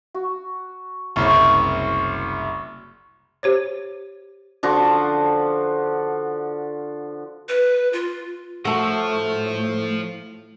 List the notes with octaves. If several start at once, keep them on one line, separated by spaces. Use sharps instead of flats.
F#4
F#1 C2 C#5 C6 C#6
G4 C5 C#5
D3 F3 F#4
B4
F4
A2 F3 A3 F#4 A4